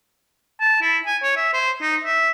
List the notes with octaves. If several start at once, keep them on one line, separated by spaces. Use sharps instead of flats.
A5
E4
G#5
C#5
E5
C5
D#4
E5